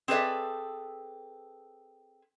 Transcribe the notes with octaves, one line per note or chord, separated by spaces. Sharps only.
C4 G#4 A4 B4 D5 E5